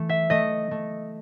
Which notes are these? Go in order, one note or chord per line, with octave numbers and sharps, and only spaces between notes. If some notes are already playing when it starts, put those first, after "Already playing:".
Already playing: E3 A3
E5
A3 D#5
A3